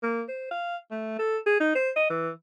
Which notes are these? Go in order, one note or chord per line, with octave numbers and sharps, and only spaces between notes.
A#3
C5
F5
A3
A4
G#4
D#4
C5
D#5
E3